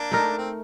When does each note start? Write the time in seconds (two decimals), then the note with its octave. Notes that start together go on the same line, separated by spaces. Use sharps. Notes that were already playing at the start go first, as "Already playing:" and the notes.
Already playing: A#3 D4
0.12 A3 D#4 A#4
0.38 C4